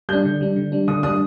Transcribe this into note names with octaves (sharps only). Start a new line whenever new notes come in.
G3 D4 G6
D3
G3 D4
D3
G3 D4
D3 D#6
G3 D4 D#6